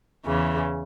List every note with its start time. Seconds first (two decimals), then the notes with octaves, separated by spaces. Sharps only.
0.24 E2 C#3 E3